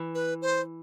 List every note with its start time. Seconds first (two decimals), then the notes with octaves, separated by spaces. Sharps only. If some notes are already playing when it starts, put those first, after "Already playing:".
Already playing: E3
0.15 B4
0.42 C5